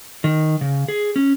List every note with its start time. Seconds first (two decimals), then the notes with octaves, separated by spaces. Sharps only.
0.24 D#3
0.61 C#3
0.88 G#4
1.16 C#4